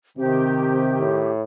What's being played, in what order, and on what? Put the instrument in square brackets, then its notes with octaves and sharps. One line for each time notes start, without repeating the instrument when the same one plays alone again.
[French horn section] C3 C4 [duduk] D#3 [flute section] G4
[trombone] A2